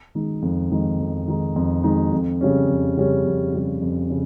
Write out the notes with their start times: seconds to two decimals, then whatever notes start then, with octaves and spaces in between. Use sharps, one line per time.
0.15 D#3 G#3 D#4
0.42 F2
0.71 D#3 G#3 D#4
0.99 F2
1.28 D#3 G#3 D#4
1.56 F2
1.84 D#3 G#3 D#4
2.12 F2
2.41 C#3 G3 C#4
2.69 F2
2.97 C#3 G3 C#4
3.26 F2
3.53 C#3 G3 C#4
3.82 F2
4.10 C#3